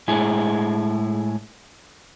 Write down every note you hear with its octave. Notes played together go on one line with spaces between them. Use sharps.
A2 G#3 E4 G#4